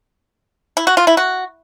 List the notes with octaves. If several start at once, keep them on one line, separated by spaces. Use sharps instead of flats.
E4
F#4
F4
E4
F#4